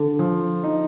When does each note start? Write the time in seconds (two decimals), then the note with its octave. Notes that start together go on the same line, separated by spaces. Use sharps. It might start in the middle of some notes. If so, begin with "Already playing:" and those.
Already playing: D3
0.19 F3
0.64 D#4